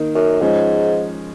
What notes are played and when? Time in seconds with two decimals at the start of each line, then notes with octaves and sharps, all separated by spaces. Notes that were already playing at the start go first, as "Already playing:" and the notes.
Already playing: D#3 A#3 D#4
0.15 F#2
0.41 G#2 F3 G#3 C#4